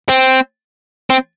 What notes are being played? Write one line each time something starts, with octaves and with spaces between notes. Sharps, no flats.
C4
C4